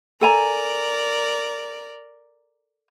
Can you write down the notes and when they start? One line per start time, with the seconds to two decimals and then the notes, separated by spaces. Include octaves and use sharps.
0.21 A4 A#4 D5 G#5 A#5